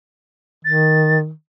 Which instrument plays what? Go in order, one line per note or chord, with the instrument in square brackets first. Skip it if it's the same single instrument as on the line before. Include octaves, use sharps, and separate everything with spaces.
[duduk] D#3 [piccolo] A6